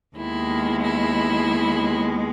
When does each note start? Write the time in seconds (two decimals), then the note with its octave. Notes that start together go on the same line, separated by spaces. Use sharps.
0.16 D#2 D#3 G#3 B3 E4
0.81 E4